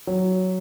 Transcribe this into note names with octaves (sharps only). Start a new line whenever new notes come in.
F#3